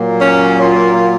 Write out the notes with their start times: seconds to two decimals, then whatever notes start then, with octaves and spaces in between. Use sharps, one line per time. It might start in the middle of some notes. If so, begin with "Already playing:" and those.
Already playing: A#2 F#3 A#3
0.20 C#4
0.59 F4